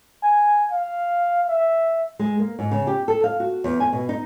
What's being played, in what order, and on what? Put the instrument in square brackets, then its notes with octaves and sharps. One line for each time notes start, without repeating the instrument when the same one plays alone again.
[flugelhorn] G#5
F5
E5
[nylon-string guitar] G#3
A#3
G#2
C#3
G4
A4
F5
F#4
E2
G#5
B2
D#4